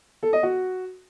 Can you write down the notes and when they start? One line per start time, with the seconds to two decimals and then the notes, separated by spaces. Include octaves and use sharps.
0.23 A4
0.33 D#5
0.43 F#4